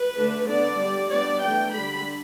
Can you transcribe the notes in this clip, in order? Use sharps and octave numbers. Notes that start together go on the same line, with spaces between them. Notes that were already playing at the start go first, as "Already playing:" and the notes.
Already playing: B4
D3 A3 D4
D3 B3 D4 D5
G3 D4
G3 B3 D4 D5
E3 A3 D4 G5
D3 G3 D4 B5